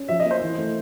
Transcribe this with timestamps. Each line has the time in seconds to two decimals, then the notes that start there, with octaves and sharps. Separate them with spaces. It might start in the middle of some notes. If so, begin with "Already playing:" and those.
Already playing: C#4
0.08 F3 E5
0.20 D#5
0.25 A#3
0.31 C5
0.41 E3
0.58 A3